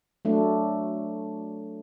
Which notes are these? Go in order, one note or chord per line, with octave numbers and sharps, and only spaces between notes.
F#3 A3 D4